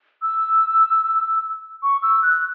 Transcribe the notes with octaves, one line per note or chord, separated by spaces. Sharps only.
E6
C#6
E6
F#6